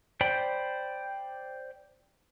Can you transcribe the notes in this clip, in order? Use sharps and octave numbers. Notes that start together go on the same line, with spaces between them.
C5 D5 G5 B5